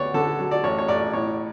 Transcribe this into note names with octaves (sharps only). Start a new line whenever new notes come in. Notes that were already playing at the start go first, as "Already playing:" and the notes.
Already playing: D2 B3 C#5 D5
D3 A4
F#3
D5
A1 C#5
C#5
A1 D5
A2 C#5